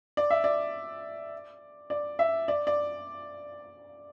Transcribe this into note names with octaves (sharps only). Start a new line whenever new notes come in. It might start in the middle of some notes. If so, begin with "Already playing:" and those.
D5
E5
D5
D5
E5
D5
D5